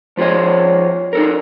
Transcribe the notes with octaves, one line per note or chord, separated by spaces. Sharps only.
F3 F4 G#4 C#5 D#5
D#4 A4 A#4